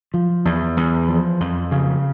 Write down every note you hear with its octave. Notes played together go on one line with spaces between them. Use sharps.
F3
E2
E2
F3
F2
C#3